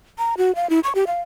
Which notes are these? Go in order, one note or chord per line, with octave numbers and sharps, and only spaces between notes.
A#5
F#4
F5
E4
C#6
G4
F5